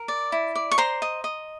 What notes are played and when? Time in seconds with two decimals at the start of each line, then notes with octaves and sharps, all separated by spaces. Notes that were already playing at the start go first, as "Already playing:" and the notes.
Already playing: A#4
0.08 D5
0.32 E4
0.55 D5
0.71 C#6
0.78 C5 A#5 C6
1.02 D#5
1.24 D#5